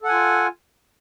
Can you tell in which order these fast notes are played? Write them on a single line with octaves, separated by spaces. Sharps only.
A4 F#5 G#5 F4